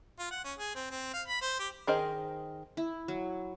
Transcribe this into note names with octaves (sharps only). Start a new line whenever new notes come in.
F4
F#5
C#4
G#4
C4
C4
F5
B5
C5
G4
D#3 G#4 A#4 C5 D#5
E4
F#3